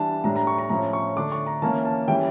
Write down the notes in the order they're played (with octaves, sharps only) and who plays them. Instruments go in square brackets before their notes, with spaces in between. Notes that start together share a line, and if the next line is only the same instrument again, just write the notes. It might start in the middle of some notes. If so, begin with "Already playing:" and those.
Already playing: [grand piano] E3 G3 D4 A5
A2 G3 D4 A#5
A#5
C#6
A#5
A2 F3 C#4 A#5
C#6
D3 A3 D4 D6
C#6
A#5
E3 A#3 C#4 A5
A5
E3 G3 C#4 G5